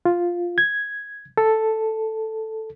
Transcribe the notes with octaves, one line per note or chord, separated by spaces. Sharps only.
F4
G#6
A4